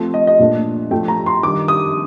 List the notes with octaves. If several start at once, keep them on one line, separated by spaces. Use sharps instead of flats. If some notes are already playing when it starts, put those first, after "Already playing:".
Already playing: F3 A3 C4
D#5
D#5
A#2 A3 D4
A2 F3 A3 G5
A#5
C6
D#3 G3 D4 D6
D#6